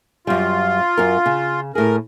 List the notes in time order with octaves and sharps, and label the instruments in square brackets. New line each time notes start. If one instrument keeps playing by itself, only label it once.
[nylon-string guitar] F#2 G3 [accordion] F4
[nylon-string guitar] F#2 A#4
C#3
[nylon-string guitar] A2 G#4 [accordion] A#4